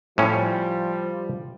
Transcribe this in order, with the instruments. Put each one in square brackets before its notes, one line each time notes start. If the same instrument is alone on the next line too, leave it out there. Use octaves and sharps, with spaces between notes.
[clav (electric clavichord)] A2 C#4 [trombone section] F3 G3